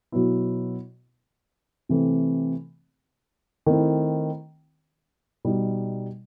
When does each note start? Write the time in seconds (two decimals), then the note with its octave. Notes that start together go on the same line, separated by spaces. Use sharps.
0.12 B2 F#3 B3 E4
1.89 C3 E3 A3 C4
3.67 D#3 A3 C4 E4
5.45 B2 G3 D#4